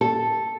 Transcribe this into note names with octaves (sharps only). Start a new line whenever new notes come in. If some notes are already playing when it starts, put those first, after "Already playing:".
A4